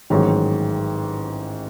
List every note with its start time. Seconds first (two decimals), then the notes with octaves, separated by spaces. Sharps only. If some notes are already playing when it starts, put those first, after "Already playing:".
0.10 A1 G#2 D#3 F#3